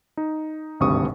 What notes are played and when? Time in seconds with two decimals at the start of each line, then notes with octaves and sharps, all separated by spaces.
0.17 D#4
0.80 G#1 D2 G2 C3 C#6 D#6